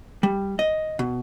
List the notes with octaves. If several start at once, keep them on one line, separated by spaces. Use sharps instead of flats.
G3
D#5
B2